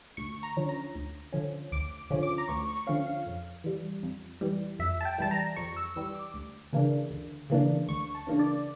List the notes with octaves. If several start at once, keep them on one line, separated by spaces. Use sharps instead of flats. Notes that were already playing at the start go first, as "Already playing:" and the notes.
D2 C#6
A#5
D3 F3 C#4
A#5
D2
D3 F3 C#4
D2 D6
D3 F3 C#4
D6
A#5
D2 C#6
C#6
D3 F3 C#4 F5
F5
F2
E3 G3
F2
E3 G3
F2 E5
A5
G5
E3 G3 A5
A#5
F2 C#6
E6
E3 G3 E6
D6
D2
C#3 E3 A#3 D4
D2
C#3 E3 A#3 D4
D2 C#6
A5
C#3 E3 A#3 D4
D5